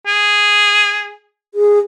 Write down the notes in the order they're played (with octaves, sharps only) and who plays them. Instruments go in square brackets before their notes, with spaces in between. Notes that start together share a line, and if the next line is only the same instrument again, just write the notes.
[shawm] G#4
[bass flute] G#4